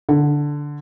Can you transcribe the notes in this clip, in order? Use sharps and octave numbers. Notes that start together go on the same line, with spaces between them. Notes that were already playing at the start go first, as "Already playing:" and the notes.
D3